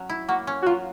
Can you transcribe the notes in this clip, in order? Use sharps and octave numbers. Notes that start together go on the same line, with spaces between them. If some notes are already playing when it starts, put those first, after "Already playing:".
Already playing: F#3 C#4
E4
A#3 F#4
C#4
F#4
F#3 F4